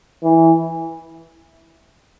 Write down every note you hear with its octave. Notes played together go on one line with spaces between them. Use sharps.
E3